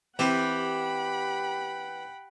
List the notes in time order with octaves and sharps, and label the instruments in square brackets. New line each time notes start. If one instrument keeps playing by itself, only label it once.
[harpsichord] E3 C4 [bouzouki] G4 [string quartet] F#5 G5 B5